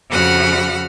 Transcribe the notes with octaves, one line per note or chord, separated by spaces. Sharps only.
F2 C#3 F#4 F#5 B5 F6